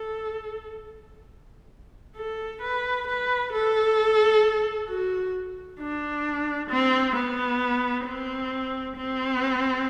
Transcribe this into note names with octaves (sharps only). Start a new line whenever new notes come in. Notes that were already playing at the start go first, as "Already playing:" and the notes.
Already playing: A4
A4
B4
B4
A4
F#4
D4
C4
B3
C4
C4